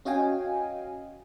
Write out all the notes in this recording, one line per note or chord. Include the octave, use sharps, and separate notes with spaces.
C#4 F#4 D#5 F5 G5 G#5